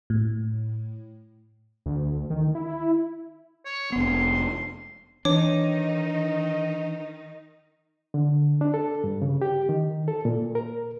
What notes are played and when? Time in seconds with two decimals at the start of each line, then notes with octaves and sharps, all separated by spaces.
0.10 A2
1.86 D2
2.30 D#3
2.55 E4
3.65 C#5
3.92 F1 B3 C6
5.25 D#3 E3 D4 D#4 C#5 D6
8.14 D3
8.61 D4
8.74 A4
9.04 G2
9.22 C#3
9.42 G4
9.69 D#3
10.08 A4
10.25 A#2
10.55 A#4